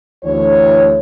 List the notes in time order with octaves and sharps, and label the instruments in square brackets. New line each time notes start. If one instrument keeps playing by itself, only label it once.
[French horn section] D2 E3 C#5